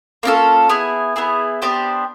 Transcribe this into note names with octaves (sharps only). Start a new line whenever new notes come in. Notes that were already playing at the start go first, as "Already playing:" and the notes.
A#3 C#4 F4 A4
B3 E4 G#4
B3 E4 G#4
B3 D4 G4 C5